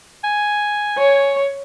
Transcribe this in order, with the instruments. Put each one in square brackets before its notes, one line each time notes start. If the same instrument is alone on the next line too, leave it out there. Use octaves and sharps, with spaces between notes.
[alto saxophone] G#5
[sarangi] C#5